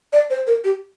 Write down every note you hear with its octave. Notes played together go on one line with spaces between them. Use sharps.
D5
C5
A#4
G4